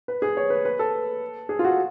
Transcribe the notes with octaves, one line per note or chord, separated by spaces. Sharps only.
B4
G#4
C#5
B4
B4
A4
G#4
F4
F#4